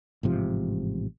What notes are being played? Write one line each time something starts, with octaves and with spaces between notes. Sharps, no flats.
A1 G#2 C3 F3